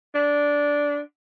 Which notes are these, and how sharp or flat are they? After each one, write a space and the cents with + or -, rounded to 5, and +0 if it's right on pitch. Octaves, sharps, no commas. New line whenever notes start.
D4 -10